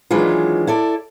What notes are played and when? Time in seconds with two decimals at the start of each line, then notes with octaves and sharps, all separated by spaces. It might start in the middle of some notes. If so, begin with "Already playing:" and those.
0.10 D#3 E3 F#3 G#3 D4 F4
0.67 E4 A4 D5